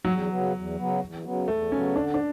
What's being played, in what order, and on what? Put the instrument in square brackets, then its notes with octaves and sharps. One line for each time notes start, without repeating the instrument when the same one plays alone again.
[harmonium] E2 [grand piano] F#3
[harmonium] C#3 F#3 B3
E2
C#3 F#3 B3
E2
C#3 F#3 B3
[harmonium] E2 [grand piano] A3
[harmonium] C#3 F#3 B3 [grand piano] C#4
[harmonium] D3 [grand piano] D4
[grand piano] D4